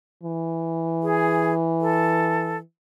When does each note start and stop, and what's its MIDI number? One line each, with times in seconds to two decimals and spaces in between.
0.23 2.61 52
1.03 1.54 68
1.81 2.57 69